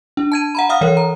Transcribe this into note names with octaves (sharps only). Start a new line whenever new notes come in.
D4
A5 G#6 D#7
F#5 A#5 B5
F5 F#5 D#6 F6
E3 A#4 C#5
A#5